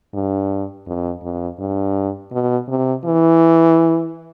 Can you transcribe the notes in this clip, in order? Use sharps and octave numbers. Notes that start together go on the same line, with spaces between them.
G2
F2
F2
G2
B2
C3
E3